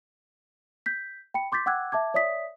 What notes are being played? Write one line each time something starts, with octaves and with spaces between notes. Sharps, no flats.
G6 B6
G5 B5 C#7
C6 D6 G6 A6 B6
F#5 G5 D6 E6 F#6 G#6
E5 A5 D6 G#6
C#5 D5 E5 D#6 B6